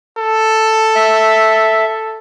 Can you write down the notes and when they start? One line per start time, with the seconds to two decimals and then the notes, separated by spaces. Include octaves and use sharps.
0.17 A4
0.95 E5